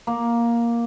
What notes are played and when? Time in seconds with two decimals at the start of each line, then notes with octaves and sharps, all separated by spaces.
0.07 A#3